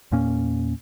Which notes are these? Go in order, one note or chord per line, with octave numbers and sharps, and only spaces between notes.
E2 A#2 A#3 C#4